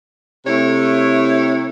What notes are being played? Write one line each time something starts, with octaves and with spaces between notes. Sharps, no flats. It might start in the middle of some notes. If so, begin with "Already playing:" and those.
C3 A3 E4 C#5